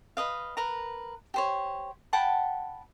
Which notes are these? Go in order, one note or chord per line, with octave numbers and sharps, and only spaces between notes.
B4 D#5 F5
A#4 B4 A#5
G4 C5 C#5
F#5 G5 A5 B5